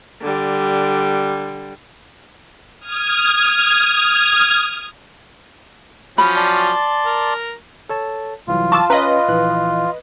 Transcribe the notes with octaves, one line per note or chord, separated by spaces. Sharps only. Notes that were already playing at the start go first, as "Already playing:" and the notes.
D3 G3
D#6 F6 G#6
F3 F#3 C#4 B5
D5 A5 C6
A#4
A4 C#5 A5
C2 E3 F#3 F4
A5 C#6 D6 E6
C#4 B4 C#5 D#5 F5 A#5
A#1 E3 F#6